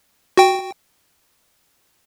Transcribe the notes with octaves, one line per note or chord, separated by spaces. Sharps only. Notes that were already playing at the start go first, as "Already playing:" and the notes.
F#4 G5